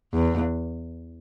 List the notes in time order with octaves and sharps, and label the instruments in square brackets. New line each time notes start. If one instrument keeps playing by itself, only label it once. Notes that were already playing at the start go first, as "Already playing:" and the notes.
[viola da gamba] E2